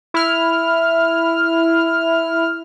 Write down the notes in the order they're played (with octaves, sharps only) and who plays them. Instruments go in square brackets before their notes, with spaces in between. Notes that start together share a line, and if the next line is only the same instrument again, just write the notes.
[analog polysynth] E4 F6